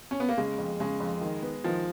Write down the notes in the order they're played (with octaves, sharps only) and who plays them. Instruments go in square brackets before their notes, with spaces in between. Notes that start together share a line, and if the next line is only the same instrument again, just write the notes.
[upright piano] C#4
B3
A#3
[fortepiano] C#3 [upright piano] G#3
[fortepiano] F2
[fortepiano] C#3 [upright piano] G#3
[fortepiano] F2
D#3
B3
[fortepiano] D#3 [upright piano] F3